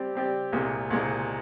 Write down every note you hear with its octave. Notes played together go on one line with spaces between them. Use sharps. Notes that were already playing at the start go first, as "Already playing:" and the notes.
Already playing: G3 C4 G4 D5
G3 C4 G4 D5
C2 A#2 G#3
C2 A#2 G#3